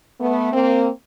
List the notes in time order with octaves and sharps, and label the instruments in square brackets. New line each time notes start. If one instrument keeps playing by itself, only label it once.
[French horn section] A3 B3
A#3 C4